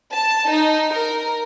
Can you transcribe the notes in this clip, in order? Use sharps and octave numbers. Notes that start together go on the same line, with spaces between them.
A5
D#4
A#4